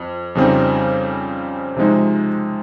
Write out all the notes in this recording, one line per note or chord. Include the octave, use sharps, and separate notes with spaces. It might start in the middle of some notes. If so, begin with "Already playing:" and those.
Already playing: F2
F2 C#3 G3 C4 D#4
C3 F3 G#3 D#4